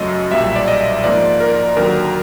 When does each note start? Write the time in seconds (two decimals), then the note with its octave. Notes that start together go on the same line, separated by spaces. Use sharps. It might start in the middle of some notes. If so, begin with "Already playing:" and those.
Already playing: F#2 C#3 F#3 A3 D#5
0.31 B1 A#2 G3 E5
0.56 D5
0.68 D#5
1.04 G#2 F3 A#3 D5
1.40 A#4
1.77 D#2 D3 F#3 A#4